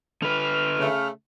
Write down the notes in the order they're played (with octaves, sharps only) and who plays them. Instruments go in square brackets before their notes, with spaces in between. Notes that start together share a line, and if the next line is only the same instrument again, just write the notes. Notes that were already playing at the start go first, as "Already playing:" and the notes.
[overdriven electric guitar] D3 B4 [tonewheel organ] F6
[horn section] C#3 A3